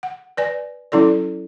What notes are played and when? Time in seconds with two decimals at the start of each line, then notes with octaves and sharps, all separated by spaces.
0.03 F#5
0.37 B4 D5 G#5
0.92 F#3 C#4 E4 A4 D5